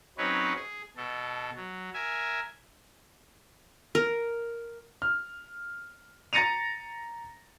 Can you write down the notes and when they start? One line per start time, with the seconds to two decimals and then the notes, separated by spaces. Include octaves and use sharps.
0.18 F#3 C4 C#4 D#4 B4 C#5
0.55 G#4
0.96 B2 A4
1.56 F#3
1.94 A#4 E5 G#5
3.95 A#4
5.02 F6
6.33 A#5 A6 A#6 C#7 D#7 F7